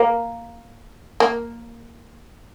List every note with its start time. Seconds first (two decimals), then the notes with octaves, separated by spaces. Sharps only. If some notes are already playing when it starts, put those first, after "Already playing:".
Already playing: A#3
1.20 A#3